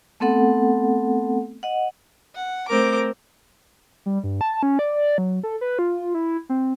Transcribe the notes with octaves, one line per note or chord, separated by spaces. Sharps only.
A3 B3 C4 A4 F#5
D#5 F#5
F#5
A3 C4 A#4 D6
G3
G2
A5
C#4
D5
F#3
A4
B4
F4
E4
C4